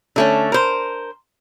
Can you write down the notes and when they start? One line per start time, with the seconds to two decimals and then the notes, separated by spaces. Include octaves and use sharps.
0.16 D3 A3 C#4
0.52 A#4 C5